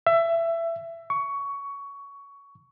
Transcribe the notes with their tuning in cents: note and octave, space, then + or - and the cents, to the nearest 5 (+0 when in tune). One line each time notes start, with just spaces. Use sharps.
E5 +20
C#6 +15